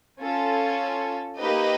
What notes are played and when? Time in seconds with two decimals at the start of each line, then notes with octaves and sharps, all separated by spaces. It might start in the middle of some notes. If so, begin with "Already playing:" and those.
0.22 C#4 F4 A4
1.39 A#3 D#4 G4 B4 D#5